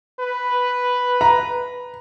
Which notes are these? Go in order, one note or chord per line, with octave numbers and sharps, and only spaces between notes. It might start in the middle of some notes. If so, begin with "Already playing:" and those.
B4
A#5